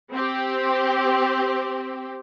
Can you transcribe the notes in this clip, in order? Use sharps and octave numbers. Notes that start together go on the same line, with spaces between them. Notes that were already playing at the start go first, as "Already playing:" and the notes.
C4 G4